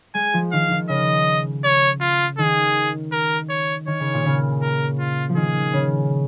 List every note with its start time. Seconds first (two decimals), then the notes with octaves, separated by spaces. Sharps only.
0.14 G#3 G#5
0.34 F3
0.52 D#3 F5
0.72 D#3
0.89 C#3 D#5
1.65 C#5
2.01 F4
2.39 D#3 G#4
3.12 A#4
3.50 C#5
3.87 D#3 C#5
4.00 C#3
4.14 A#2
4.25 C#3
4.62 A#4
4.99 F4
5.29 F3
5.36 D#3 G#4
5.73 C#3